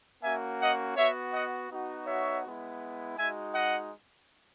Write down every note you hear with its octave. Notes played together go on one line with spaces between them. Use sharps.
A#3 C#4 F#4 E5 G#5
D#5 F#5
B3 F#4 C#5 E5
D#5 F#5
B3 D#4 F#4
C#5 E5
G#3 B3 E4
G#3 D#4 F#4 E5 G#5
D#5 F#5